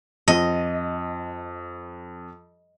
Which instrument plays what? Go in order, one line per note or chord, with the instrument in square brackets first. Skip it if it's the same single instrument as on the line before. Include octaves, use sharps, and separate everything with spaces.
[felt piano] F2 [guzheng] D#5